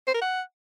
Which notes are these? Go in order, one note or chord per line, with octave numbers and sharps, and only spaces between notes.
C5
A#4
F#5